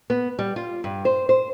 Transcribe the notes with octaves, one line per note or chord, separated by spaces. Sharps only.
B3
G3
F4
G2
C5
C5